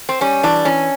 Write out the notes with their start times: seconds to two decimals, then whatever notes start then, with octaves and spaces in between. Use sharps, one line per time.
0.09 C4
0.21 G3 C#4
0.43 E3 D4
0.65 E3 C#4